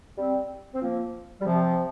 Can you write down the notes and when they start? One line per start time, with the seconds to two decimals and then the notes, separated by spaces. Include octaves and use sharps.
0.17 G3 C4
0.74 C4
0.81 F3 A#3
1.40 G3
1.45 C3 F3